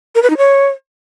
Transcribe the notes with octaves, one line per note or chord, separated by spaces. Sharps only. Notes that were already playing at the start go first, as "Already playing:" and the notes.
A#4
B4
D#4
C#5